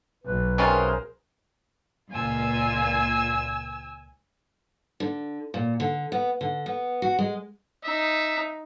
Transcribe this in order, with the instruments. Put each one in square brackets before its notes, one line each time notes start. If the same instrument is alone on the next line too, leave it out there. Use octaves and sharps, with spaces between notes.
[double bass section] B1 [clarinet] B4
[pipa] C3 C#4 F4 [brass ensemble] G#4 A#4 C5
[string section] C#2 A#2 F4 [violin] G#5 E6
[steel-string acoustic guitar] D3
A#2
D3
B3
D3
B3
F#4
G#3
[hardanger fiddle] D#4 [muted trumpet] E5